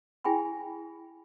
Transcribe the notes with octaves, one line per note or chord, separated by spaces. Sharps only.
E4 G#4 G5 G#5 B5